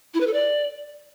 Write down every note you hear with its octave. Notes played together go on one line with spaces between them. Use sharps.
E4
B4
A4
D5